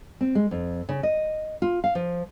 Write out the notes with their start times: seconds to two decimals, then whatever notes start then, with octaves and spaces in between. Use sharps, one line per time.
0.21 C4
0.35 G#3
0.51 F2
0.89 C#3
1.03 D#5
1.62 F4
1.84 F5
1.95 F3